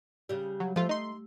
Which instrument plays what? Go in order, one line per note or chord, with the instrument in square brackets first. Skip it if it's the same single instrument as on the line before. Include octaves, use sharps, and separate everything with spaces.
[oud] C#3 G3
[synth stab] F#3
[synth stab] F3 F4 [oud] A3
[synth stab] D#4 C6